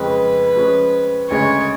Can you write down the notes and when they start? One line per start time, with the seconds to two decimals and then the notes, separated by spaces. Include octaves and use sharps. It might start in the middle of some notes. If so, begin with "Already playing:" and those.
Already playing: F2 C#3 G#3 C#4 G#4 B4
0.56 F3 G#3 C#4
1.29 D2 C#3 G#3 C#4 G#4 C#5